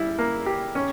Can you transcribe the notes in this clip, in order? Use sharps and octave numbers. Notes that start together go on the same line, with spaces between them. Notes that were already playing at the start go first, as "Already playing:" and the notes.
Already playing: G3 E4
A#3
G4
C#4